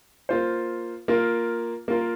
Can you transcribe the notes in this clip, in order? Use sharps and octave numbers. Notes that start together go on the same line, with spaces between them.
A#3 F4 C5
A#3 F4 A#4
A#3 F4 A#4